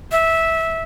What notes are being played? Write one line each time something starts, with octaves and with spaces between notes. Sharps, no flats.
E5